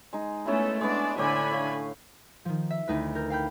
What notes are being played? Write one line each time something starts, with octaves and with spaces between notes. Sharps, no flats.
G#3 D#4
A3 B3 C#4 E4 A4
G#3 B3 D4 D5
A2 D3 C5 D5 G#5 B5
C#5 F5
D#3 F3
E5
D2 D#4 E4 B4
A#4 G6
F5 G5 B5 G6